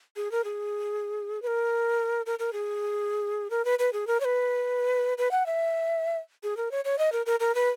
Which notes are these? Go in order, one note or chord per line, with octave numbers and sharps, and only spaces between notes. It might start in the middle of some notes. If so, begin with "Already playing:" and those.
G#4
A#4
G#4
B4
A#4
A#4
A#4
G#4
A#4
B4
B4
G#4
A#4
C#5
B4
B4
F#5
E5
G#4
A#4
C#5
C#5
D#5
A#4
A#4
A#4
B4